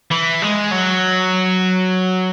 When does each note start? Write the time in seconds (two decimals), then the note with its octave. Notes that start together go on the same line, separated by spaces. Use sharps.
0.11 E3
0.42 G#3
0.71 F#3